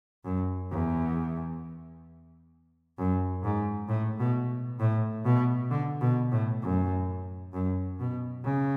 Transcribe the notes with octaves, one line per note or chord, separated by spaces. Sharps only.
F#2
E2
F#2
G#2
A2
B2
A2
B2
D3
B2
A2
F#2
F#2
B2
C#3